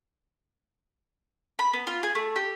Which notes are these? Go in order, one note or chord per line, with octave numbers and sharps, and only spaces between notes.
B5
B3
F4
G#4
A3
G4